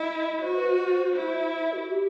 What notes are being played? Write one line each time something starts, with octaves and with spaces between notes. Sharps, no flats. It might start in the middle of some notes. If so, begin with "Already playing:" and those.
Already playing: E4 D#5
F#4 C5
B4
C5
E4 C5
E5
E5
F#4
G4